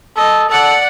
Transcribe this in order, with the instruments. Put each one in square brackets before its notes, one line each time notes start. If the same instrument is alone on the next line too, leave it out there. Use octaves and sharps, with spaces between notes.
[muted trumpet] A4 [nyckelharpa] D#5
[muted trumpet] A4 [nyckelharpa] D5 F#5